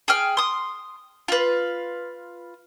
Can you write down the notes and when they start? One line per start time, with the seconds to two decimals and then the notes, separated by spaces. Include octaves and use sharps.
0.08 G#4 G5 F6
0.37 C6 D#6
1.28 F4 B4